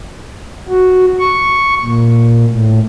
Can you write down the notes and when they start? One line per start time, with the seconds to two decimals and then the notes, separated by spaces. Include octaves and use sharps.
0.68 F#4
1.19 C#6
1.83 A#2
2.49 A2